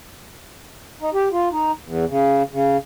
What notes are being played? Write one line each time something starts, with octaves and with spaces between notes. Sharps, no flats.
D#4
G4
F4
D#4
E2
C#3
C#3